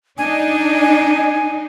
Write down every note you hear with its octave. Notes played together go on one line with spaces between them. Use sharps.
D4 D#4 G#5